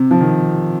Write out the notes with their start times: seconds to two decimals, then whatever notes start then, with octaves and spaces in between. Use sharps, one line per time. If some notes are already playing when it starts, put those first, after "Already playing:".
Already playing: C3
0.11 F3
0.21 D#3